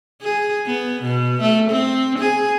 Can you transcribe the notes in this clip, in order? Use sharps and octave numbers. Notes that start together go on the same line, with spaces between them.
G#4
B3
B2
A3
C4
G#4